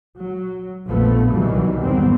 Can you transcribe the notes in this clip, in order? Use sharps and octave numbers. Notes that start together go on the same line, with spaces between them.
F#3
A#1 F2 B2 F3 A3 B3
C2 B2 D#3 E3 F#3 G3
E2 G#2 D#3 G3 B3 C4